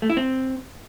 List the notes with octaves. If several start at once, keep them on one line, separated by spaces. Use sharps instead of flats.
A3
E4
C4